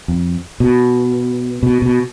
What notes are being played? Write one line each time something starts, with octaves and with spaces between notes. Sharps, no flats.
F2
B2
B2
B2